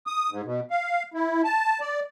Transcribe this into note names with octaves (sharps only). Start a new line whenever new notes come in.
D#6
G#2
B2
F5
E4
A5
D5